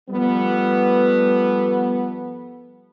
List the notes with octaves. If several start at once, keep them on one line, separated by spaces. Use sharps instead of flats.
F3 G3 A3 B3